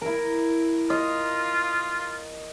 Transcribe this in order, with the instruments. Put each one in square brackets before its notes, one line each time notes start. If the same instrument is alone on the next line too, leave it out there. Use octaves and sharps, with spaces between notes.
[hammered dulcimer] E4 A#4
[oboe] F4 [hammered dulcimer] D#5